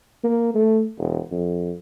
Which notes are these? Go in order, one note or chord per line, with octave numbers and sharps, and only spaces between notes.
A#3
A3
E1
F2